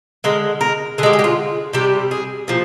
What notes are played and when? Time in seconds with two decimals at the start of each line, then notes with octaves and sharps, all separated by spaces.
0.24 D3 G#3 A#4
0.61 A#4
0.98 D3 G#4
1.03 G#3 G4
1.13 G#4
1.19 G4
1.24 F4
1.73 C3 G3 G4
2.11 G#4
2.48 A#2 F3